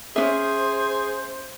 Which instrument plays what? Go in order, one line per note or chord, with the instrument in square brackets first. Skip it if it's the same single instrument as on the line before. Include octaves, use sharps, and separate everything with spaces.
[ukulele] C#4 D4 E5 [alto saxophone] G#4 [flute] C5